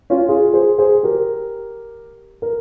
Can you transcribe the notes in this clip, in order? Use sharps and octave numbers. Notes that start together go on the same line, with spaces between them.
C#4 F4
F4 G#4
G#4 C5
G#4 C5
G4 A#4
A#4